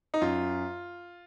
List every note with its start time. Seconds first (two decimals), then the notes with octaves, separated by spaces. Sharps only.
0.14 D#4
0.21 F#2 F4